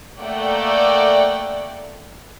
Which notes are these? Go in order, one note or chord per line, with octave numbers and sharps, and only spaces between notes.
A3 A#3 D5 F#5 G5